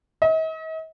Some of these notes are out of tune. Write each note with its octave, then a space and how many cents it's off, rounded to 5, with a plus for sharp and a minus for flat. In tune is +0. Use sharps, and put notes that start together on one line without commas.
D#5 +45